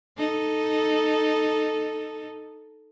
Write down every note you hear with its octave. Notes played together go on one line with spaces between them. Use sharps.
D#4 A4